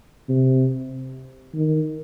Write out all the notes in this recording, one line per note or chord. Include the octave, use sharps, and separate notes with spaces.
C3
D#3